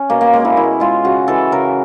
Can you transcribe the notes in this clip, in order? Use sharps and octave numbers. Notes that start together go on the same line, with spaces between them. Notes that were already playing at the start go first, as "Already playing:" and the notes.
Already playing: C#4
B2 A#3
A#3
G#3 A#3
E4
B2 E4
G#3 F4
C#3 F#4
E3 G#3 A4
C#3 A#4